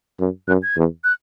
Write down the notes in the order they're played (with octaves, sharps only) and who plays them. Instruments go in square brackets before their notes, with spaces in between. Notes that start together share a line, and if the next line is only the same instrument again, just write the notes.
[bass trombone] F#2
[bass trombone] F#2 [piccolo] F#6
[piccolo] G#6
[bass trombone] E2
[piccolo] F#6